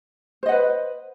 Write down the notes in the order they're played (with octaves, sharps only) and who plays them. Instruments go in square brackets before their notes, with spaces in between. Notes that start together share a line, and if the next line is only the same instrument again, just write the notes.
[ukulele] C5
D#5
F#5
B4